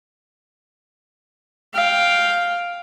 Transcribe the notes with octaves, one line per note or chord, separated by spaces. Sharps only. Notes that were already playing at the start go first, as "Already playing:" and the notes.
F5 G5